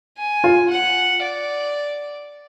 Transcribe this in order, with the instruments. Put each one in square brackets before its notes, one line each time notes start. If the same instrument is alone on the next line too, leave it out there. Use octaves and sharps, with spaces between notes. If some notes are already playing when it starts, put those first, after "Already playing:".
[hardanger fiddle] G#5
[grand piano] F4
[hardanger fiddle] F#5
D5